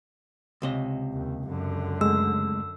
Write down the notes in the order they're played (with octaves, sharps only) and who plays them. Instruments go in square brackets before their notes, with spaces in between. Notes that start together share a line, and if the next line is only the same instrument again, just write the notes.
[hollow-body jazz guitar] C#2 C3 D#5
[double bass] D#2
F#2 D3
[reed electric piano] G#3 A3 [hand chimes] E6